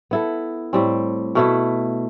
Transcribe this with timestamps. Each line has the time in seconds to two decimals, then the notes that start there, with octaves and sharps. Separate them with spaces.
0.11 B3 E4 A4
0.73 A2 G3 C4
1.35 B2 A3 E4